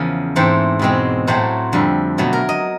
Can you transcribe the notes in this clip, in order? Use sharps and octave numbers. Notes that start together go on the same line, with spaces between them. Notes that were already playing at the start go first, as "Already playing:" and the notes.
Already playing: E2 C#3 F3 A#4
G#2 E3 A3 C4 C5
E2 B2 G#3 C4
A2 F#3 A3 C4 C5
F2 D3 G3
B2 F#3 A3
A#4
D#5